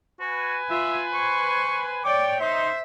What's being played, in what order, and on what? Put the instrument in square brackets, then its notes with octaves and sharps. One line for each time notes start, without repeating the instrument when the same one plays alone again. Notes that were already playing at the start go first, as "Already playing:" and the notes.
[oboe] F#4 [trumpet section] B4 G#5
[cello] F4 [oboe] E5
[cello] C5 [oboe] C#6
[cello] C#5 D5 [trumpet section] G5 [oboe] D6
[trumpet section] D#4 C6 [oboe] C5 [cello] E5